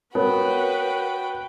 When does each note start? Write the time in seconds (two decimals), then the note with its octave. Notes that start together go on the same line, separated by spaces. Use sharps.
0.15 B3 F#4 A#4 B4 C#5 G5